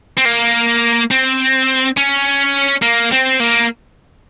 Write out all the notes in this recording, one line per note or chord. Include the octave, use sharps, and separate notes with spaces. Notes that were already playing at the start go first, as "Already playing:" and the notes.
C4
A#3
C4
C#4
A#3
C4
A#3